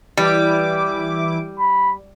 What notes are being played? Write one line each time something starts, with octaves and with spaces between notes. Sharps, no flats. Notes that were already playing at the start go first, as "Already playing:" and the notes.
E3 G3 E4 D6
B5